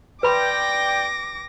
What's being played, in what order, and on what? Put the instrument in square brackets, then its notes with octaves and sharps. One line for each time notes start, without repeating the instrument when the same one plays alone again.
[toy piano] B4 B5 C6 [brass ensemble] D5 G5 [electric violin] D6 A#6